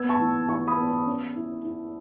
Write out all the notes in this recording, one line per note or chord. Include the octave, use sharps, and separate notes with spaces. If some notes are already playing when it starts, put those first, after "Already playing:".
Already playing: B3 E6 G#6
A5 C#6
E3
E3 A5 C#6
B5 D#6
B3
C#4
E4
E4